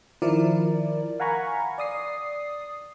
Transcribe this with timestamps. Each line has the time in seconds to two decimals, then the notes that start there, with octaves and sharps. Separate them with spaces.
0.22 D#3 F3 E4 A#4 D5
1.20 F5 F#5 G#5 A#5 B5 C#6
1.78 D5 D#6 C7